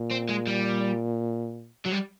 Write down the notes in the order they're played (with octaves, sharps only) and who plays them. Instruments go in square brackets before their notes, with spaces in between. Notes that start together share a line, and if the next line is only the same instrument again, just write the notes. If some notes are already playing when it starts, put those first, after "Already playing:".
Already playing: [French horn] A#2
[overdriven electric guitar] C4
G#3
G3
F#3
G3